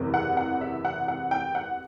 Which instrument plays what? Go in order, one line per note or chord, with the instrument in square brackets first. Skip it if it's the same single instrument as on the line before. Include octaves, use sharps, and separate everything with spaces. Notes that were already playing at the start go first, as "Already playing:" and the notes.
Already playing: [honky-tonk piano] F#1 E2 C3
F#5
F#5
E5
F#5
F#5
G5
F#5